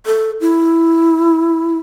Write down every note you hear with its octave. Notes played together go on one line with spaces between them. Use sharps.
A4
E4